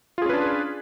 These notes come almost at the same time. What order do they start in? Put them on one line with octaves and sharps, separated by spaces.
F4 G#4 C#4 B4 D4